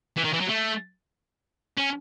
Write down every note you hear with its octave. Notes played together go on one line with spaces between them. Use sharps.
E3
D#3
E3
F#3
A3
C#4